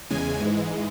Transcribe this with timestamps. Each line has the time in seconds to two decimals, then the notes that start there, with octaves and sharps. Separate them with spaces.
0.10 E2 C#3 G#3 G#5
0.40 G#2 E3 G#3